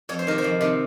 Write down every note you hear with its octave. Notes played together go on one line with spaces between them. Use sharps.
F2 C#5
C5
C3 D#3 A#4
C5
F2
C3 D#3